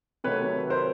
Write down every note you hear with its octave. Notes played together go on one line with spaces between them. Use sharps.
C3 D#3 F#3 A3 B4 C#5
A#4 C5